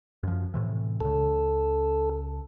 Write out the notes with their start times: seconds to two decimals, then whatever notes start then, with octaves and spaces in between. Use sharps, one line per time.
0.23 F#2 F3
0.54 A2 C3 E3
1.01 C#2 C#3 A4